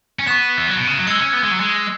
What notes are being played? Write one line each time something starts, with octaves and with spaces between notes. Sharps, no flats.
C#4
B3 C#6 F#6 E7
E3
F#3
B2
C#3
F#3
G#3 E6 G#6 C#7
C#4
B3
G#3
F#3
G#3